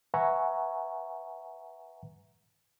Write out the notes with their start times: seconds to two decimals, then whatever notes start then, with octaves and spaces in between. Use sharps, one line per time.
0.14 B4 E5 F#5 G#5 A#5 C#6